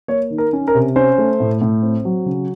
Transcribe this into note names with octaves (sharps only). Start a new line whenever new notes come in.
A#3 C#5
D#3
A#4
C#4
A#4
C3
C#4 C5
A3
A2
A2
C4
F#3
C#3